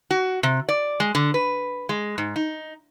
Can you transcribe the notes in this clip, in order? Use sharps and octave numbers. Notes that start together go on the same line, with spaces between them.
F#4
C3
D5
G#3
D3
B4
G#3
G#2
D#4